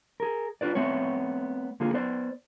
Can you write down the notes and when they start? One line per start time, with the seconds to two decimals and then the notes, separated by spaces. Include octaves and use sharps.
0.20 G#4 A#4
0.61 D4 F4 B4 D5
0.75 A3 B3 C4 C#5
1.80 D3 A#3 F4 G#4
1.93 B3 B4 C5 D5